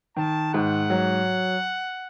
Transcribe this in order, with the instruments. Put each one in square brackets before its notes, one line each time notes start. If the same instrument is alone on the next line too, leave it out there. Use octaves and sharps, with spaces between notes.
[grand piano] D#3 [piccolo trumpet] A5
[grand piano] G#2 [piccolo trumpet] F#5
[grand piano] F#3